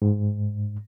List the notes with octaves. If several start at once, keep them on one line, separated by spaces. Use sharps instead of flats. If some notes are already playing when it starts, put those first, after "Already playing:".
G#2